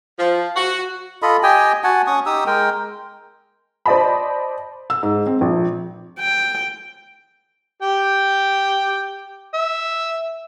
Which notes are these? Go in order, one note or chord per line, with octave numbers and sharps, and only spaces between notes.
F3
F#4
F4 A4 D#5 B5
G4 D#5 G5 G#5
F#4 F#5 G#5 A5
C#4 C#6 D#6
D#4 G4 D#6 E6
G#3 A#4 G5
C5 D5 D#5 A5 B5
E6
G#2
C4
A#1
G5
G4 G5
E5